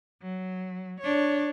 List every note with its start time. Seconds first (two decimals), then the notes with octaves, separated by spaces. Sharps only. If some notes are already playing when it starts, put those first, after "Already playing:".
0.22 F#3
1.00 D4 C#5